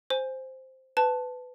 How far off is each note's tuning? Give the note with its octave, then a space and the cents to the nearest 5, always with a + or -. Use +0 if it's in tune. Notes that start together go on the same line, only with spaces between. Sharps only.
C5 +0 G#5 -5
B4 +20 A5 +0